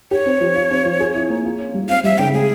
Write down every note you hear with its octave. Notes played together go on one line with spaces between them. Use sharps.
G4 C#5
C4
F3
F4
C4
F3
G#4
E4
A#3
F4
C#4
G3
C4 F5
G3 E5
C#3 G5
G#3 G#4